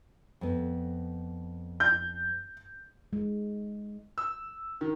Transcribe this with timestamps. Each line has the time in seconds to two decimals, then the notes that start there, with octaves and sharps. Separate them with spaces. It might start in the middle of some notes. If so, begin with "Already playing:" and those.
0.41 F2 B3
1.80 G6
3.13 G#3
4.18 E6
4.81 D#3